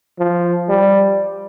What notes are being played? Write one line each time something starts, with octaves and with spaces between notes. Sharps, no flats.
F3
G3